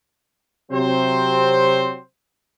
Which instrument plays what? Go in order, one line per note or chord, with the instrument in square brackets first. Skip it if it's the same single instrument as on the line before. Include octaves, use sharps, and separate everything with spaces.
[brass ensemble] C3 F#3 C4 C5